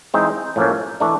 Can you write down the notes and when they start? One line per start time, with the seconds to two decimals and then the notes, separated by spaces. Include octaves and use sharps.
0.14 E3 G#3 C4 D#4
0.56 A2 F3 A#3 C#4
1.00 E3 A3 D4